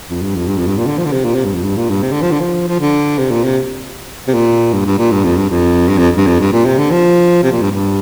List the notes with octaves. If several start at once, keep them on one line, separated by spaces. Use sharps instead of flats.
F2
G2
F2
G2
F2
G2
A#2
D3
F3
D3
C3
A#2
C3
G2
F2
G2
A#2
G2
C3
D3
F3
D3
F3
F3
D3
C3
A#2
C3
C3
A#2
G2
G2
A#2
G2
F2
G2
F2
G2
F2
G2
F2
G2
A#2
C3
D3
F3
C3
A#2
G2
G2